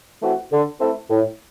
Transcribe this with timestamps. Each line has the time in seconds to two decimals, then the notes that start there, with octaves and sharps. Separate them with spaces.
0.22 E3 A3 C4 F#4
0.51 D3
0.80 A3 C4 E4 A4
1.10 A2